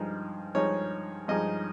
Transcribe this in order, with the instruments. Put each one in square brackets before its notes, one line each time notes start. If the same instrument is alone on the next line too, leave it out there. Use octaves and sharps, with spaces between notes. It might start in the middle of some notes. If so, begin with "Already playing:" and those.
Already playing: [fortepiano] G2 F3 G#3 D#4
G2 F3 G#3 D#4 C#5
G2 F3 G#3 D#4 D#5